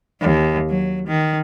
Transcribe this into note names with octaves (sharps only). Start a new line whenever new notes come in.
D#2
F#3
D#3